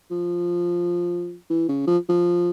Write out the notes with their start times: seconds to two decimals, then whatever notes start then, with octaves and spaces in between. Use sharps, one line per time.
0.11 F3
1.50 E3
1.69 C#3
1.87 F3
2.09 F3